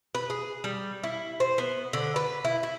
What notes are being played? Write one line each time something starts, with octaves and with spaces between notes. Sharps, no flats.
B4
G#4
G3
E4
C5
B3
D3
B4
E4
E4